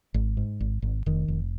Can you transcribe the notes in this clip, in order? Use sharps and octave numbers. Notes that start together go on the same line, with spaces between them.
G#1
G#2
G#1
G#1
F1 D#3
F1